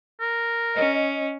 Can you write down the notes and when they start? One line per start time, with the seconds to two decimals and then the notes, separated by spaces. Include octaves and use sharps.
0.21 A#4
0.76 C#4 D#5